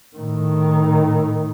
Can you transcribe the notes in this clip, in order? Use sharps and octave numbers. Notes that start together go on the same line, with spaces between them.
A2 D#3